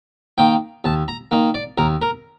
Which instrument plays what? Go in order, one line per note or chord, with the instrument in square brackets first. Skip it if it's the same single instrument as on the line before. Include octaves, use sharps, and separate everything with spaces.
[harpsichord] D#3 A#3 G5
D#2 A5
A#5
D#3 A#3
D5
D#2 A#4
A#4